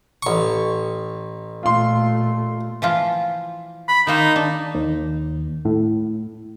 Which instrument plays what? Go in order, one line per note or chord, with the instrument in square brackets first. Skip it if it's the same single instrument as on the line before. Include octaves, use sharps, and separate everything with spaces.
[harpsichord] A1 C#6
[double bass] A#2 A3 [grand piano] F4 C6
[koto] E3 F3 F4
[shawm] B5
[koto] D#3 A#3 C5 [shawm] D#4
[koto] D4
[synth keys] D#2
A2